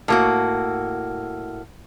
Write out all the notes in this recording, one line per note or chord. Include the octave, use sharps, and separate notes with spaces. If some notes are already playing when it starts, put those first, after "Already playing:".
A2 A#3 F#4